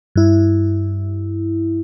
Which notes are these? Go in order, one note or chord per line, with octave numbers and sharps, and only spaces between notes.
G2 E4